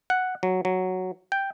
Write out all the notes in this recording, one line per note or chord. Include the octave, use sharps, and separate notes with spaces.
F#5
F#3
F#3
G5